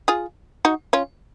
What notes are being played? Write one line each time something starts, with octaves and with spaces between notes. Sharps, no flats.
F4 G#4
D#4 F#4
C#4 F4